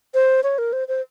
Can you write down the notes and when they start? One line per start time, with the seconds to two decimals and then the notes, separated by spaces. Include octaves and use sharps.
0.14 C5
0.43 C#5
0.58 A#4
0.73 C5
0.88 C5